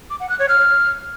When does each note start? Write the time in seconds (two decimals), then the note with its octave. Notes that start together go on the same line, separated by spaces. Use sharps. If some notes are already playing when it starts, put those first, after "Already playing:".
0.10 D6
0.20 F#5
0.30 F#6
0.39 C#5
0.49 F6